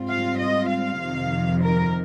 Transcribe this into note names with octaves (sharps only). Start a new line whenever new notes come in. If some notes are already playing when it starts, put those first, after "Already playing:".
Already playing: G#2 G3 C4 F4
F5
D#5
F5
F2 C3 D#3
A#4